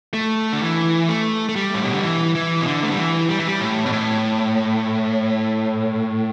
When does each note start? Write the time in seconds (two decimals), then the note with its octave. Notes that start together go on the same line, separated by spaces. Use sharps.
0.14 A3
0.53 D3
0.62 E3
1.09 A3
1.49 A3
1.56 G3
1.74 A2
1.84 B2
1.93 D3
2.03 E3
2.35 E3
2.61 B2
2.67 D3
2.83 A3
2.91 G3
2.98 E3
3.29 G3
3.38 E3
3.47 G3
3.60 A2
3.86 B2
3.92 A2